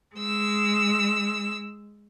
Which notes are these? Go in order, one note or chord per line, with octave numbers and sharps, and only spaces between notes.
G#3 E6